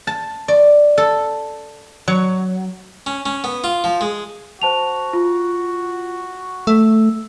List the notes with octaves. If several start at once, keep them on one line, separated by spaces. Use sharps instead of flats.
A5
D5
A4
F#3
C#4
C#4
B3
F4
F3
G#3
F#4 C5 A5 F7
F4
A3 E6